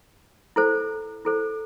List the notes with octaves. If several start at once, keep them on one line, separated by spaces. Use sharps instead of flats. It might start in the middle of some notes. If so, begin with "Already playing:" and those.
E4 A4 C5
E4 A4 C5